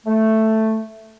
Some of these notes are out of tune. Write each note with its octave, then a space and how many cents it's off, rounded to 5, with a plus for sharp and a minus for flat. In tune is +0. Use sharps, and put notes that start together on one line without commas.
A3 +0